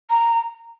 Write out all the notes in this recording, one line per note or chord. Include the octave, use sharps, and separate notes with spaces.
A#5